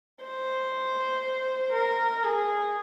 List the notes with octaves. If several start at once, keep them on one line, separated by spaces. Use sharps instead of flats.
C5
A#4
G#4